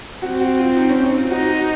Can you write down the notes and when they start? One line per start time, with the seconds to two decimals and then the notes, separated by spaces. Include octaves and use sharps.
0.22 C4 F#4
0.40 F#4
0.59 F4
0.76 D#4
0.89 C#4
1.04 D#4
1.17 F4
1.30 D#4 F#4
1.49 F#4